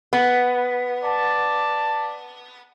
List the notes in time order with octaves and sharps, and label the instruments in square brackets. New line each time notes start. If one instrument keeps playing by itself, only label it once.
[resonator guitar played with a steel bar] B3
[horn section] D5 A5